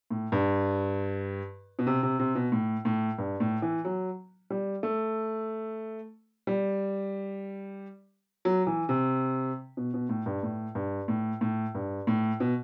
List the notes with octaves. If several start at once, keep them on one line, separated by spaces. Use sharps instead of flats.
A2
G2
B2
C3
C3
C3
B2
A2
A2
G2
A2
E3
F#3
G3
A3
G3
F#3
E3
C3
B2
B2
A2
G2
A2
G2
A2
A2
G2
A2
B2